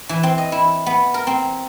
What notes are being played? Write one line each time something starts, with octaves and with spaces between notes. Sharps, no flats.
E3
C4
D#5
E4
B3
A#4
C4